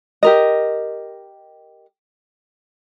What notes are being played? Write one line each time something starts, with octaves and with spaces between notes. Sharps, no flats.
G4 A#4 D#5